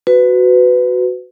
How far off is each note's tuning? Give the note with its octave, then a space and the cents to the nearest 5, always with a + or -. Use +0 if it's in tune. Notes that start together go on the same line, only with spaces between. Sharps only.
F#4 +0 B4 +20